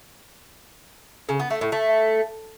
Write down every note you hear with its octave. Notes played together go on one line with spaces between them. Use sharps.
C#3
B3
A3
A2
A3